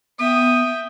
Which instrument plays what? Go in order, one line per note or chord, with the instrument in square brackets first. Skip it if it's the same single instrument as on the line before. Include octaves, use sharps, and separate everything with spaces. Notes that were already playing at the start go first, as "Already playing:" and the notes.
[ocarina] B3 [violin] E5 G5 [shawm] D#6